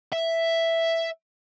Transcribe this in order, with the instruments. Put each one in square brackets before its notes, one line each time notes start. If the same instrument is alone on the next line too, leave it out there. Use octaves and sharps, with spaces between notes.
[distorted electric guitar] E5